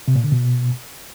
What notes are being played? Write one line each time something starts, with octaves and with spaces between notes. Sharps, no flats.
C3
A#2
D3
B2